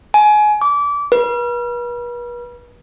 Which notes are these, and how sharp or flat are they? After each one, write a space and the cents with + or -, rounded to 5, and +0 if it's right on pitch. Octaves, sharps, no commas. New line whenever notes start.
G#5 +25
D6 -25
B4 -40